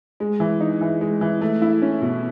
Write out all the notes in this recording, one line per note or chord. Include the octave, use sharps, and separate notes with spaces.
G#3
E3
D#4
E3
G#3
E3
A3
E4
C#4
B2